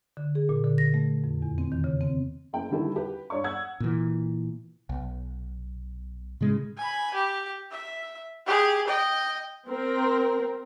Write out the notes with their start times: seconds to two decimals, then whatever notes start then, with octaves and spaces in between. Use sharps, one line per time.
0.17 D3
0.35 G#4
0.49 A#2
0.64 D3
0.78 A#6
0.94 A3
1.24 F2
1.42 E2
1.58 C4
1.72 D#3
1.84 C#3
2.01 C4
2.53 F#1 G5
2.71 D3 D#3 G3 E4 A4 B4
2.96 G4 B4
3.30 G2 C#5 D5 C#6
3.44 F#5 D#6 E6 G#6
3.80 A#2 E3
4.89 B1
6.41 A2 C#3 G#3
6.78 G#5 B5
7.14 G4
7.71 E5
8.46 G4 G#4
8.87 D#5 G5
9.68 C4 A#4